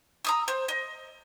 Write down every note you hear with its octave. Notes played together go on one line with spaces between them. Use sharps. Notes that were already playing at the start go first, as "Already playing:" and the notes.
A#5 D#6 E6
C5
D#5